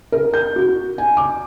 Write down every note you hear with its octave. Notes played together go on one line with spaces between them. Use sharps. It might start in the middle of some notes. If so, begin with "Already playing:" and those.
A#4
G6
F#4
G#5
D6